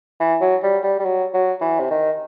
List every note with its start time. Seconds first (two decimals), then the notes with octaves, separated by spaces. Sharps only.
0.20 E3
0.41 F#3
0.63 G3
0.83 G3
0.99 G3
1.05 F#3
1.34 F#3
1.61 E3
1.79 C3
1.90 D#3